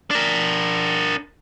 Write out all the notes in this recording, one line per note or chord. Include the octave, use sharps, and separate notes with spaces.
D4 A#4